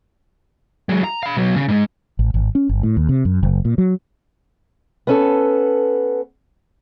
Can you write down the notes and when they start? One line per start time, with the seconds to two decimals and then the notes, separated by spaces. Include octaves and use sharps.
0.89 F#3 G#3
1.04 A#5
1.23 F5 B5
1.35 B1 F#3
1.56 C#3 C#4
1.68 G#2 G#3
2.19 A1
2.34 G#1
2.55 C#4
2.69 G1
2.83 A2
2.97 D#2
3.09 C3
3.25 F#2
3.43 F#1
3.65 A#2
3.78 F#3
5.07 B3 C#4 A4